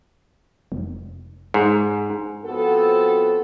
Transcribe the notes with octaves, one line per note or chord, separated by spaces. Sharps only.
F1
G#2
F3 B3 C4 F#4 A4